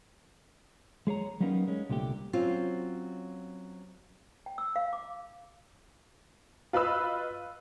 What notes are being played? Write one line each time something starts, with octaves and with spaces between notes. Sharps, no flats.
G#3 G#4 C#5 A#5
F#3 G3 A#3 B3 C#4 D#4
G#3 C#4
C2 A#2 D3 A3 G4
F#3 C4 C#4 F4
G5
E6
F5
D6
F4 B4 D#5 B5 E6